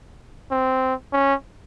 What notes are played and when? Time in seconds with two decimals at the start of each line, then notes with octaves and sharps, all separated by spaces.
0.51 C4
1.13 C#4